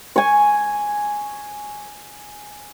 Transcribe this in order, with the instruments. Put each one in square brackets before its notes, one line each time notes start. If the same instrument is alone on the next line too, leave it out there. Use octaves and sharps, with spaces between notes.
[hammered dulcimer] G#5 C#6